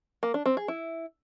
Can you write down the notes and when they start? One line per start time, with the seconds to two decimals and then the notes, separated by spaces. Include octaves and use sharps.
0.23 A#3
0.34 D4
0.46 C4
0.57 G#4
0.68 E4